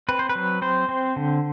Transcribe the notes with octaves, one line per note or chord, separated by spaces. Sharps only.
C4 B4
C5
B4
F#3
C4 C5
C4
D3